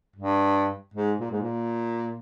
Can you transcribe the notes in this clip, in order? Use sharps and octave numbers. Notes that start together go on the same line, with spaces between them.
G2
G#2
A#2
G#2
A#2